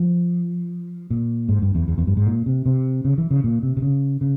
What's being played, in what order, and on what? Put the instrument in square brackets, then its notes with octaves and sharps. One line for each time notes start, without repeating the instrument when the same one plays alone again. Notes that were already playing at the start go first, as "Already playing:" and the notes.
Already playing: [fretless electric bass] F3
A#2
G#2
G2
E2
E2
E2
G2
G#2
A#2
C3
C3
C#3
E3
C#3
A#2
C3
C3
C#3
C#3